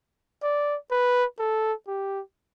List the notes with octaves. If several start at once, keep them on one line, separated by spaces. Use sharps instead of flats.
D5
B4
A4
G4